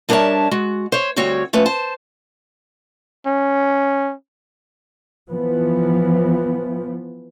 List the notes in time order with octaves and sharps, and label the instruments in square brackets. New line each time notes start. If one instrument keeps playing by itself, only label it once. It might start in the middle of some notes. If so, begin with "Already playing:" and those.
[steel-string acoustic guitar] G3 D4 A#4 C#5 E5 A5
G#3 F#4
C5 C#5
D2 G3 C4 F#4 C#5
F3 A3 C#4 B4
C5 A5
[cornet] C#4
[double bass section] E3 F3 B3